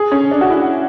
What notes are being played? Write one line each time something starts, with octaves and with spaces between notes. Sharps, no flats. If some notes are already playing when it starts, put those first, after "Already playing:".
Already playing: G#4
C#4
D4
F#4
E4